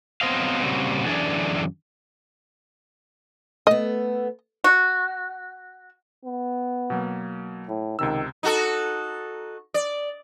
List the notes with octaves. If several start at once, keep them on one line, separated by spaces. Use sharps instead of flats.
F#3 B3 C4 C5 D#5 F5
A#2 C#3 G3 C4 F#4
F#2 D3 E3 D4 G#4 D5
A3 B3 D#5
F#4
B3
B2 F#3 A#3
A2
C#2 C3 D#3 E6
D#4 F#4 A4
D5